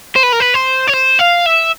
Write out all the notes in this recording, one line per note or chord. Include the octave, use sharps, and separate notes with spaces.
C5
B4
A#4
B4
C5
C#5
C5
F5
E5